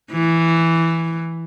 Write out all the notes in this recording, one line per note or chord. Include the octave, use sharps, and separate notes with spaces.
E3